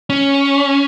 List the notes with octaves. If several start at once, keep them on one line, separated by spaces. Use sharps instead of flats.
C#4